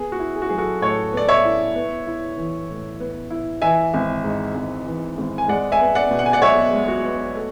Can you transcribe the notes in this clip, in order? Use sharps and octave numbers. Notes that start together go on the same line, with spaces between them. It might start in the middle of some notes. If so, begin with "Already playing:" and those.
Already playing: B3 G#4
F#4
E4
G#4
F#4
F#3 G#4
F#4 A4
A2 A4 C#5
B3 D5
C#5 E5
E4
B3
E4
E3
A2
B3
E4
E3 E5 G#5
G#1
G#2
G#1
E3
G#1
G#5
G#3 D5 F#5
E5 G#5
B3
D5 F#5
B2
F#5
G#5
D5 F#5
B1 C#5 E5
G#3
F#4
B3
A3